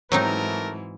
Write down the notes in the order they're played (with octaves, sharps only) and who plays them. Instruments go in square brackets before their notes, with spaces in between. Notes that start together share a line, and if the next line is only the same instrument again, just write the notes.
[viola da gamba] G#2 E3 [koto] F#3 C4 D#4 [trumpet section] A3 A#4